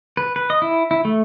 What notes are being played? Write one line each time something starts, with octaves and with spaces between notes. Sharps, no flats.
B4
B4
D#5
E4
E4
A3